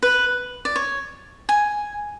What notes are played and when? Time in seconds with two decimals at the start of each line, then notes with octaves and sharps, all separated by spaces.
0.03 B4
0.65 D5
0.76 C#5
1.49 G#5